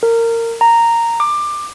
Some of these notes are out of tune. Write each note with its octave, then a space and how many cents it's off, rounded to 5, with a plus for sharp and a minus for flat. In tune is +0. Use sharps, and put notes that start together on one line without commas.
A#4 -20
A#5 -10
D6 +20